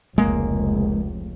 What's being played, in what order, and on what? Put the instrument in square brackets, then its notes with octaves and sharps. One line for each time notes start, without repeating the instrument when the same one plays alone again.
[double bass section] F1 C#2 [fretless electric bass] G#3 A#3